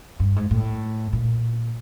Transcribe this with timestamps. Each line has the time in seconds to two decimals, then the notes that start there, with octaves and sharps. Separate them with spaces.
0.20 G2
0.36 G#2
0.51 A2
1.13 A#2